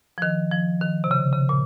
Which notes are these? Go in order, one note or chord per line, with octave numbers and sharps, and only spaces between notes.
F3
D#3
F3
D#3
C3
C#3
C#3
A#2